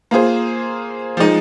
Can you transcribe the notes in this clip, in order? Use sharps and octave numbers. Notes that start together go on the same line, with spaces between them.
A#3 F4 G#4 C5
F3 G#3 D#4